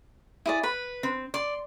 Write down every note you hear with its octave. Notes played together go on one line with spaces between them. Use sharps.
E4 G#4 D5
B4 B5
C4
D5 C6